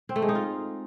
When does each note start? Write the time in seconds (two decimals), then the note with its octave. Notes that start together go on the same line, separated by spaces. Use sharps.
0.09 C4
0.16 A3
0.22 G#3
0.29 D#4
0.35 F4